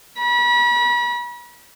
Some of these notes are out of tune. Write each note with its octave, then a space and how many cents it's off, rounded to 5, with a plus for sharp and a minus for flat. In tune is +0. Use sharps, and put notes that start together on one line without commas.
B5 -40